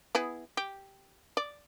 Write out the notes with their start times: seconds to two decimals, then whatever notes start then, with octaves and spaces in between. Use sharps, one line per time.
0.15 B3 E4 G#4
0.57 G4
1.37 D5